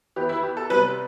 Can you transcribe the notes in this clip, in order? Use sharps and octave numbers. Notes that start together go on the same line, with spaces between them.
E3 B3 G4
E4
G4
A4
C3 G3 B3 B4